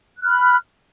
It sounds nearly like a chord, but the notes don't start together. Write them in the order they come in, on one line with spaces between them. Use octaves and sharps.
F#6 F6 B5